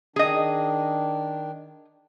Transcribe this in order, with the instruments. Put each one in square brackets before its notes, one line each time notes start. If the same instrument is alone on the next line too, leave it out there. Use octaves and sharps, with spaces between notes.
[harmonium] D#3 D4 [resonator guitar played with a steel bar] G#4 D#5